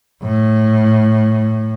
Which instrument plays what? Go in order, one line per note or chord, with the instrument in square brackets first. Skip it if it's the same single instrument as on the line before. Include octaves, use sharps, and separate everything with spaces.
[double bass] A2